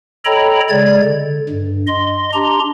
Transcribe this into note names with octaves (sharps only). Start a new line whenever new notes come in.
A4 C#5 D#5 G5 A#5 B5
C#3 G#3 D5 G#6
D3
G2
D#5 C6
D4 G4 A#5 C6